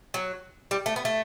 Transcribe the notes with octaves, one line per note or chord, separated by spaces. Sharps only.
F#3
G3
A3
B3
A3